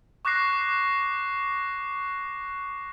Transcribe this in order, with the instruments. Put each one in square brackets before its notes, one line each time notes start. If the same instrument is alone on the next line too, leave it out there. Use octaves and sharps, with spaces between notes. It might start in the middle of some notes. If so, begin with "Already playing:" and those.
[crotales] C#6 D6 F#6 A#6 C7